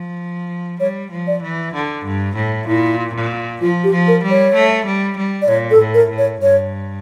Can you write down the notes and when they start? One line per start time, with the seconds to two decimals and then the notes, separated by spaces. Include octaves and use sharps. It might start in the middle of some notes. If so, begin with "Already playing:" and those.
Already playing: F3
0.80 G3 C#5
1.11 F3
1.27 D5
1.42 E3
1.74 D3
2.04 G2
2.36 A2
2.67 A#2 E4
3.14 A#2
3.61 F3 F4
3.84 G4
3.92 F3
4.08 A#4
4.23 G3
4.30 C#5
4.54 A3
4.85 G3
5.17 G3
5.42 D5
5.48 A#2 C#5
5.71 A4
5.79 A2
5.94 A#4
6.10 A2
6.18 C#5
6.41 G2 C#5